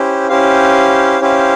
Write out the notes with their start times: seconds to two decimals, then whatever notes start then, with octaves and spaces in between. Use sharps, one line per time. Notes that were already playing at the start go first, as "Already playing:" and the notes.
Already playing: C#4 E4 G4 C5
0.29 C#4 E4 G4 C5 F5
1.21 C#4 E4 G4 C5 F5